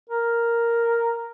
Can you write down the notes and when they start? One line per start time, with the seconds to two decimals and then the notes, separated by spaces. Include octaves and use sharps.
0.10 A#4